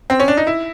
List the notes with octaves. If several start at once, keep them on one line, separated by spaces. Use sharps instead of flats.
C4
C#4
D4
D#4
E4